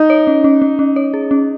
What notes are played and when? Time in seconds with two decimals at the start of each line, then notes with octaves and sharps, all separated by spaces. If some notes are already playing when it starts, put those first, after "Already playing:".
Already playing: D#4
0.10 C#5
0.27 C#4
0.44 C#4
0.62 C#4
0.79 C#4
0.96 C#5
1.14 G#4
1.31 C#4